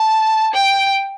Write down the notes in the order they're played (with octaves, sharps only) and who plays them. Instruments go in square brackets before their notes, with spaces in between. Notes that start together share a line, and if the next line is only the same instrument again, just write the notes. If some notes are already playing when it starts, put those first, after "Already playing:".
Already playing: [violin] A5
G5